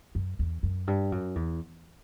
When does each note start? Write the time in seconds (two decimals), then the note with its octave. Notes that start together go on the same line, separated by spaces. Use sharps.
0.15 F#2
0.39 E2
0.63 F#2
0.87 G2
1.12 F#2
1.35 E2